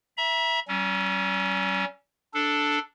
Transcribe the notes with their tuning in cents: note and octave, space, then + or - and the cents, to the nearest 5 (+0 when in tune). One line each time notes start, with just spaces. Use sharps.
E5 +0 A#5 +40
G3 -45 C#4 +0
D4 +0 A4 +0